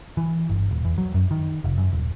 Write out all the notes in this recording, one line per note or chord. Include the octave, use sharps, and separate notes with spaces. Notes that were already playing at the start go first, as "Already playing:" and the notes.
E3
G1
D#1
E2
F#3
F#2
D#3
F1
F#2
D#1